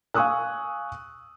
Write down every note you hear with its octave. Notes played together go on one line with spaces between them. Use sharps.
F5 G#5 C#6 D#6 E6 F#6